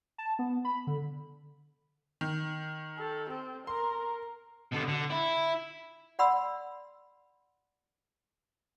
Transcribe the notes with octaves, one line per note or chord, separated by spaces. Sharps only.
A5
B3
B5
D3
D#3
A4
C4
A#4 C6
B2 D3
D3
E4
D5 F#5 B5 C6 E6